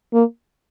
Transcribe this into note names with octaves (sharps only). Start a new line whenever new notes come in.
A#3